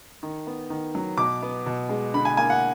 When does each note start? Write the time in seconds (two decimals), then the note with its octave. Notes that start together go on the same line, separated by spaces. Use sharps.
0.23 D#3
0.47 B3
0.70 D#3
0.95 F#3
1.18 B2 D6
1.42 B3
1.66 B2
1.89 G#3
2.14 D3 B5
2.25 G#5
2.37 A#3 G#5
2.50 F#5